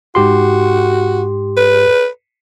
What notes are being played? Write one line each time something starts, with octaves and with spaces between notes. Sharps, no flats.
G#2 F#4 G4 C6
B4